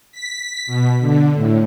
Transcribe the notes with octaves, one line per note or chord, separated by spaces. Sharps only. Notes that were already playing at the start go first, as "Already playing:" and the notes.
B6
B2
D3
A2